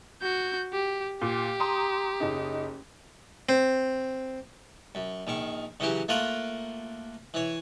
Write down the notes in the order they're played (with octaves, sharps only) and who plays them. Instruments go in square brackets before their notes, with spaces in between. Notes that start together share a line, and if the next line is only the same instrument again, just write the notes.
[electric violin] F#4 G6
G4
[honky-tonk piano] A#2 [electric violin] G4
[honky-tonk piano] A#5 C6 D#6
F#1 D#4
[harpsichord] C4
F#2
A#1 D#3 C#6
C#3 E3 F#3 G4
A3 A#3 F4 A#4 F#5
E3 C#5